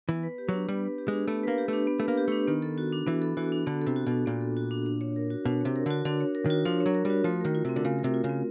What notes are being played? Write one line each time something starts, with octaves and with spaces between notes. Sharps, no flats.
E3 B3
B4
G4
F#3 D4
G3 B3
B4
G4
G#3
D4
A3 B3
A#3 B4
G4
A3 D4
B3
A3
B4
A#3
G4
A3 D4
D#3 B3
A4
F#4
D4
E3 B3
A4
E3 F#4
D4
D3 B3
C3 A4
F#4
B2 D4
A#2 B3
A4
F#4
D4
D4
C#5
A#4
F#4
B2 D4
C3 C#5
A#4
D3 F#4
D3 D4
C#5
A#4
D#3 F#4
F3 D4
C#5
F#3
A#4
G3
F#4
F3 A3
D#3 A#4
F4
C3 C4
D3
C#3 A3
A#4
C3
F4
C#3
C4